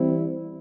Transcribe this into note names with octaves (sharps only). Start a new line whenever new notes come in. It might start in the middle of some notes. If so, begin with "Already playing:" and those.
Already playing: E3 G3 C4 E4